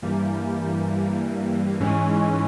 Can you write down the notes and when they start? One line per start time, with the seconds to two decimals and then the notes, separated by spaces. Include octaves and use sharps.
0.02 G2 E3 G3 A#3
1.80 G#2 E3 G#3 C#4